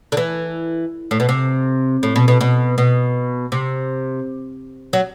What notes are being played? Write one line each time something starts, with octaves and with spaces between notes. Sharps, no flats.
D3
E3
A2
B2
C3
A2
B2
B2
B2
B2
C3
F#3